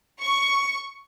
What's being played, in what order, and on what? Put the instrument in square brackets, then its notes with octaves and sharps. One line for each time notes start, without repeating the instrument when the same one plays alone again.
[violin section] C#6